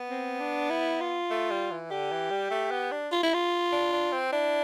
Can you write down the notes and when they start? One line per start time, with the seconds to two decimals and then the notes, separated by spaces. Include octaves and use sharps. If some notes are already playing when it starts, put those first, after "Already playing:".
Already playing: B3
0.10 C4
0.40 D4
0.71 E4
1.01 F4
1.30 A3
1.51 G3
1.71 E3
1.91 D3 G4
2.12 E3
2.31 G3
2.51 A3
2.71 B3
2.92 D4
3.12 F4
3.23 E4
3.34 F4
3.72 D4
3.93 D4
4.13 C4
4.32 D4 E4